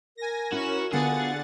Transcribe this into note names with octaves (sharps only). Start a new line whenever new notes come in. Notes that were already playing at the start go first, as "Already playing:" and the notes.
A#4 G#5 A#6
C#4 E4 F#4 E7
D3 B3 F4 F#4 G#4 F#5 A6